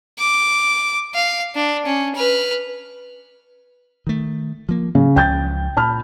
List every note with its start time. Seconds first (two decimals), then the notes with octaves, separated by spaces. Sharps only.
0.19 D6
1.15 F5
1.55 D4
1.86 C#4
2.15 B4 F6
4.07 D#3 A3
4.69 F3 A#3
4.95 C#3 F#3
5.16 C#2 F3 G5 G6 A6
5.77 A#2 A5 B5 F6